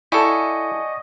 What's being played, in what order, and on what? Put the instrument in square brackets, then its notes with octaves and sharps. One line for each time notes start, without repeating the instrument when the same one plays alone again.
[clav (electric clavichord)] E4 A4 [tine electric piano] D5 C#6 [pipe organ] D#5 [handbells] F#5 G#5 G6